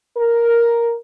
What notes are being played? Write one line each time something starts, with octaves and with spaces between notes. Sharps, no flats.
A#4